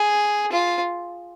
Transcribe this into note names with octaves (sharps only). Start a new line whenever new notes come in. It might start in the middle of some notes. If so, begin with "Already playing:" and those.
Already playing: G#4
F4